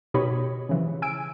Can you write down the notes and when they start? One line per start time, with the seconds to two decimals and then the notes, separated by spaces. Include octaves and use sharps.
0.14 B2 D#4 G4 C#5 B5 D#6
0.69 C#3 E3 F3
1.02 G#5 E6 D7